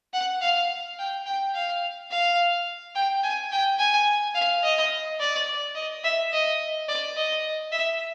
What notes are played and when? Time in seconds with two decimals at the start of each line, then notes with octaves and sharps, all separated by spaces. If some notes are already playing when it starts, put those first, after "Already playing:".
0.14 F#5
0.41 F5
0.99 G5
1.26 G5
1.54 F5
2.11 F5
2.95 G5
3.23 G#5
3.52 G5
3.78 G#5
4.35 F5
4.63 D#5
5.20 D5
5.75 D#5
6.04 E5
6.33 D#5
6.88 D5
7.17 D#5
7.72 E5